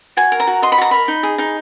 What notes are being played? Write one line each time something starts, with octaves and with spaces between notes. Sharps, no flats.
F#4 G#5
A#4
A#5
F#4
D#5 C6
B5
F#4 A#5
A#4 B5
D#4
G#4
D#4